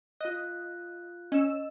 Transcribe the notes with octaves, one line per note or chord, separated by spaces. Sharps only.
F4 D#5 F#6
C#4 D#5 E6